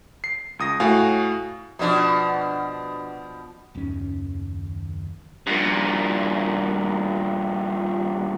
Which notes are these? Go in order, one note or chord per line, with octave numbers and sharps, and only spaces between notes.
C7
C#2 D#6 A#6
A2 F#4 F5 G#5
B2 F3 D4
F#1 D#2 D#3 C#4
G2 A#2